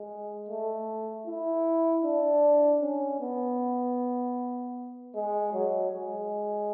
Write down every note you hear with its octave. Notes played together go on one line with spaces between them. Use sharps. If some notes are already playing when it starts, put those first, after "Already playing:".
Already playing: G#3
A3
E4
D4
C#4
B3
G#3
F#3
G#3